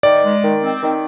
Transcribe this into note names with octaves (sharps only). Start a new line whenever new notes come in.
D#3 D5
G#3
D#3
C4
D#3